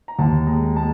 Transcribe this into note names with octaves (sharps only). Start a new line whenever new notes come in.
A#5
D#2 A5
G#3 A#5
G#3 A5